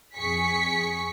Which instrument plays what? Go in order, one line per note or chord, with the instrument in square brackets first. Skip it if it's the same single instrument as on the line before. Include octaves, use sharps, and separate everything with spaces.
[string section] F2 G#4 C#6 B6 C#7